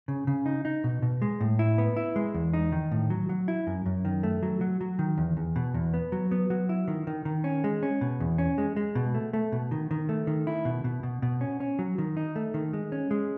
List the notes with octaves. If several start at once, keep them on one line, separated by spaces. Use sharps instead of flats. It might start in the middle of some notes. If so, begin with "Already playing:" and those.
C#3
C#3
D#4
D#4
B2
B2
G#3
A2
E4
B3
E4
G#3
E2
D#4
D#3
A2
F#3
F#3
E4
F#2
F#2
D#3
A3
F#3
F#3
F#3
D#3
E2
E2
B2
E2
B3
F#3
B3
F#3
E4
D#3
D#3
D#3
C#4
G#3
C#4
B2
E2
C#4
G#3
G#3
B2
A3
A3
B2
D#3
D#3
A3
D#3
E4
B2
B2
B2
B2
C#4
C#4
F#3
D#3
D#4
A3
D#3
G#3
C#4
G#3